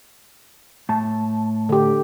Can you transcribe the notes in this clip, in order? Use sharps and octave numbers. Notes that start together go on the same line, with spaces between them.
A2 A5
D3 G4